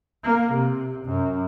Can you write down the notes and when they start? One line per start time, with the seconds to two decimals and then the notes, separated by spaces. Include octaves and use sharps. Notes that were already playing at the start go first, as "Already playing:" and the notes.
0.24 A#3
0.53 C3
1.05 F#2